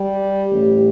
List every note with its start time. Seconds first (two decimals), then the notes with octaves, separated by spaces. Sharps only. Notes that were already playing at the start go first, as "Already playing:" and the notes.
Already playing: G3 G4
0.51 A1 A2 G3